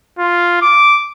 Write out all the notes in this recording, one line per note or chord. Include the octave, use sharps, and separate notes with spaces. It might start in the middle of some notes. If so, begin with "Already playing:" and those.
F4
D6